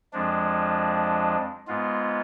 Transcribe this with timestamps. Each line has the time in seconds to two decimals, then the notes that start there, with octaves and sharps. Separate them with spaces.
0.13 F2 F3 G#3 D4
1.67 G#2 G#3 B3 F4